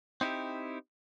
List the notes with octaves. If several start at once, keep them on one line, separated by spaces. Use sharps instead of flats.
C4 D#4 E4 F#4 G4